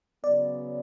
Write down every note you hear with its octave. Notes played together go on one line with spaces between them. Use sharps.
C#3 F#3 B3 D5